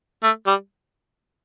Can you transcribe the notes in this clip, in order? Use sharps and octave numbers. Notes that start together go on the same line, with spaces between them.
A3
G3